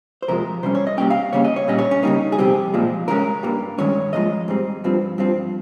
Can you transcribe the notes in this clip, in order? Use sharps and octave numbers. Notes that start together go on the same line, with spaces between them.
C5
F2 C3 F3 G#3 A#4
C3 G3 C#4 C5
C#5
D#5
C3 G3 A#3 C#4 G5
F5
C#3 G3 A#3 C#4 C#5
D#5
C#5
A#2 G3 C#4 D#5
C#5
C#4
C#3 G3 A#3 D#4
G#4
F2 C3 G3 C4 G4
A#2 F3 G#3
C#3 G#3 C#4 A#4
G2 G3 A#3
G2 D#3 G#3 C#4 C#5
G#2 F3 G#3 D#5
G#2 G3 C4
G2 F3 C4
G2 F3 C4